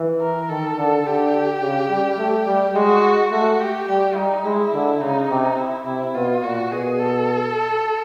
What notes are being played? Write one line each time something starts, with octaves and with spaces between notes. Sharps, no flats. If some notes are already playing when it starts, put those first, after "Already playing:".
Already playing: E3
A#4
D#3 A4
D3
D3 G4
C#3
G3
A3
G3
G#3 F#4
A3 F#4
G4
G3 G4
G3 D#4
G#3 E4
D3
C#3 D#4
C3
E4
C3 E4
B2 F4
A#2 F#4
B2 G#4
A4